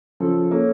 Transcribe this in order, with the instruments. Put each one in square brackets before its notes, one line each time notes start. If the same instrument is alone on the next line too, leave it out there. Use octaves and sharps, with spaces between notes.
[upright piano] C#3 F3 [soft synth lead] A4
[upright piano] A#3 C#4